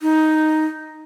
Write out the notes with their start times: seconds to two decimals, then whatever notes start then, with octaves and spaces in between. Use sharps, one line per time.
0.02 D#4